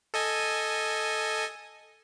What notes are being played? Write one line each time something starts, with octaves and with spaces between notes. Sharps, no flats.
A4 D#5 G#5